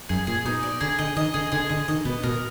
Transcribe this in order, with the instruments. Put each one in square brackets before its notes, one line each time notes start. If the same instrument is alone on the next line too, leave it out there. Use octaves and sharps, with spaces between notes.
[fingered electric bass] F#2 [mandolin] G#4
[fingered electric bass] A#2 [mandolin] G#4
[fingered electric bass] B2 [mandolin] D#4
[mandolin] D5
[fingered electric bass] D3 [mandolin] G#4
[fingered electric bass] D3 [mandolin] D#5
[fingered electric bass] D#3 [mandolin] D#5
[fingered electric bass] D3 [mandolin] G#4
[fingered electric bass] D3 [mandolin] G#4
[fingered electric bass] D3 [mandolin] D#5
[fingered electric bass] D#3 [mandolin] D#5
[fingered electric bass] B2 [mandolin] B3
[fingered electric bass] B2 [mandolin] A#4